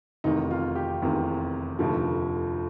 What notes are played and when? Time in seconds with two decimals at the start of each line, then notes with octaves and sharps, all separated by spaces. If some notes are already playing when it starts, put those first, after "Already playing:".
0.24 F1 E2 C3 D#3 D#4
0.51 F4
0.75 G4
1.02 F1 E2 C3 D#3
1.79 F1 D#2 D3 F3